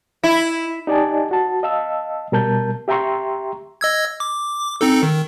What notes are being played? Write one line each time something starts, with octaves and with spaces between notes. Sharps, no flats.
E4
D#4 G4 D5 D#5 G#5 A5
F#4 A5
D#5 F5 A5 E6
B2 G3 A#4 A5 G6
G4 E5 G5 A#5 C6 C#6
D#5 E6 G#6
D6
C4 D#4 A4
D#3